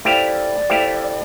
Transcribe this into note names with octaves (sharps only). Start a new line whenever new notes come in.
A3 E4 G4 C5 D5 F5
A3 E4 G4 C5 F5